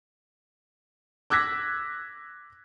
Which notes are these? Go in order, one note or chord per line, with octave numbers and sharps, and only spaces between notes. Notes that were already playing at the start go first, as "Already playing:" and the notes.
D6 E6 F#6 G#6 A#6 B6